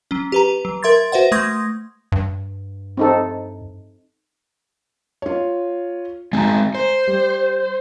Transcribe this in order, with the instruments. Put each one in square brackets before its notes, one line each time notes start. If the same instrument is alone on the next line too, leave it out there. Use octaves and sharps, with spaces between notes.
[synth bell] F#3 C#4
G4 B4 A#5
F#3
A#4 E5 C6 G#6 A6
F#4 B4 C5 E5 F#5
A3 C6 D#6 G#6 A#6
[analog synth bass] G2
[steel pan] C4 D#4 A4
[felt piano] F4 C#5
[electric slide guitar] G#3 C4 F#4 [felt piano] G#5 A#5
[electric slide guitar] C5
[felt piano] G3